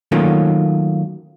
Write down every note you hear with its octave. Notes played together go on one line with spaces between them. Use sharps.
D#3 F#3 A3 A#3 C#4 F4